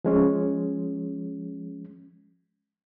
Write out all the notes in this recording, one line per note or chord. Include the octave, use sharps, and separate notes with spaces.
F3 G#3 C#4